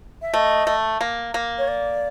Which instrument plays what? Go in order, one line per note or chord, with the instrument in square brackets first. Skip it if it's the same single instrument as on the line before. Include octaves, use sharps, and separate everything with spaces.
[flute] E5
[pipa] A3 [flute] D#5
[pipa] A3
A#3
A#3
[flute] C#5
D5